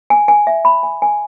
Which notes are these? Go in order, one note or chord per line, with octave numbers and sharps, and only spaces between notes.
G#5
G#5
E5
B5
G#5
G#5